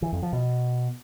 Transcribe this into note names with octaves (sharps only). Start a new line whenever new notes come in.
E3
F2
F3
B2